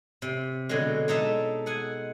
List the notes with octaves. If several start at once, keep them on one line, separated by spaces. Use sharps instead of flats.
C3
B2 D3 F#3 G#3
G#3 D#4 A4 E5
G#4 F#5 G#5